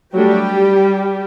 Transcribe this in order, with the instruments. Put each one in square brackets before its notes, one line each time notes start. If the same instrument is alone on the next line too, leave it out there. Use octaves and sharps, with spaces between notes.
[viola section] F#3 G3 A3 D4 G4